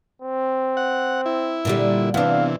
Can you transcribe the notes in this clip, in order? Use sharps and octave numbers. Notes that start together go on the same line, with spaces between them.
C4
F#5
E4
A#2 D3 G3
C3 E3 B3 D4 F5